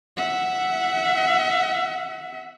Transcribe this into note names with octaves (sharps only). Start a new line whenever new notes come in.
E5 F#5